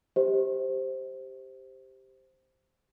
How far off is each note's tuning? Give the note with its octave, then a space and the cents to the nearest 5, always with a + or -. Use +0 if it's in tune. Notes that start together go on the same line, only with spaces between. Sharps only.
G4 +0 C5 +0 D#5 +35